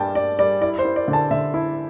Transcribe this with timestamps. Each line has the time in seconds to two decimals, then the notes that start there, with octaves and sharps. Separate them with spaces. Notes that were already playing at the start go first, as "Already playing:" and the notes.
Already playing: G2 G3 G5 A5
0.15 G2 D5
0.39 G3 D5
0.61 E4 D5
0.79 C5
0.85 E4
0.96 D5
1.08 D3
1.13 A5
1.31 D3 E5
1.54 E4